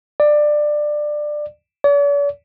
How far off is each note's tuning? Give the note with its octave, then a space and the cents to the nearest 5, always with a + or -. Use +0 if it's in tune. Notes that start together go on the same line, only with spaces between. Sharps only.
D5 +20
D5 -45